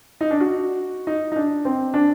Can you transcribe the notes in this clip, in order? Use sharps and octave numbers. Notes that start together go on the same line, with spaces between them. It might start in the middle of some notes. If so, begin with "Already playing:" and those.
D#4
D4
F#4
D#4
D#4
D4
C4
D4